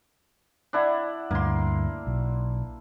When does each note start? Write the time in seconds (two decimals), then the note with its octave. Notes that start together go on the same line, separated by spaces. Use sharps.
0.73 D4 E4 F#5
1.31 D2 G2 A#3 C6
2.07 B1